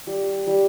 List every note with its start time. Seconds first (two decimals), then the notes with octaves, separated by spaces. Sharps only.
0.07 G3
0.47 G3